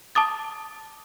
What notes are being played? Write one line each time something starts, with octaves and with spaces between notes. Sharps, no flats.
A5 D6 D#6 A6